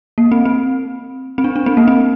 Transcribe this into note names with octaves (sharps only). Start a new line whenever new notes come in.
A#3
C4
C4
C4
D4
D4
C4
A#3
C4